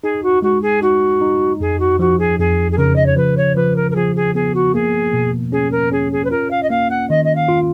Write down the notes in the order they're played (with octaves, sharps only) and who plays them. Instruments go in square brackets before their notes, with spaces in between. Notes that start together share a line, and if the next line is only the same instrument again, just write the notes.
[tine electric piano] D#4 [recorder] G#4
[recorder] F#4
[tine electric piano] G#3 [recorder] F#4
[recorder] G#4
[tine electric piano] D#4 [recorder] F#4
[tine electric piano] D#4
[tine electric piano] F2 [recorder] G#4
[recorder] F#4
[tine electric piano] F3 [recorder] F#4
[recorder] G#4
[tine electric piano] F2 [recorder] G#4
[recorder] G#4
[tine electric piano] C#3 [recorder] A#4
[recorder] D#5
C#5
[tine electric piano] F3 [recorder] B4
[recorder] C#5
[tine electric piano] F3 [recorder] B4
[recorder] A#4
A#4
[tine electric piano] F3 [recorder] G#4
[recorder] G#4
[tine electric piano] B3 [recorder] G#4
[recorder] F#4
[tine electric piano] A#3 [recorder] G#4
[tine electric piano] B2
[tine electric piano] C#4 [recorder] G#4
[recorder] A#4
[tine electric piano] C#4 [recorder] G#4
[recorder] G#4
B4
[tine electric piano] F4 [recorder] A#4
[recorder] F5
D#5
[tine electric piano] A#3 [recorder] F5
[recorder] F#5
[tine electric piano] D#3 [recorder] D#5
[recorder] D#5
F5
[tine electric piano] F4